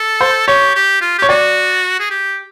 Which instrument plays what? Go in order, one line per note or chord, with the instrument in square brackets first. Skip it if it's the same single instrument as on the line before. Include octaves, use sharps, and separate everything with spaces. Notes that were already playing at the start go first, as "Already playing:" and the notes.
Already playing: [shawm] A4
[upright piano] C5
[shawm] G4 [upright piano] C#5
[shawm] G4
F4
[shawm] G4 [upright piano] C#5
[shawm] F#4 [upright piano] D5
[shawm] G#4
G4